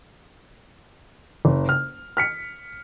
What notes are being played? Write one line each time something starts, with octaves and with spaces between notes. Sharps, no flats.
F#1
F6
F6 B6 C#7